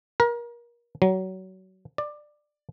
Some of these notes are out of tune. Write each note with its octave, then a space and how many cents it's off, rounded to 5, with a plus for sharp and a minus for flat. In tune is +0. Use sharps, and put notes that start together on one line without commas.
A#4 +30
F#3 +25
D5 +15